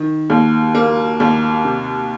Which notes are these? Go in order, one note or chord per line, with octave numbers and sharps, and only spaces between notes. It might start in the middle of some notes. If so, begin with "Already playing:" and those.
Already playing: D#3
D#2
A#3
D#2
C3